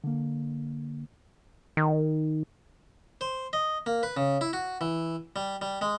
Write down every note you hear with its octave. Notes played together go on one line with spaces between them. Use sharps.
D3 A#3
D#3
C5
D#5
A#3
B4
C#3
E4
F#4
E3
G3
G3
G#3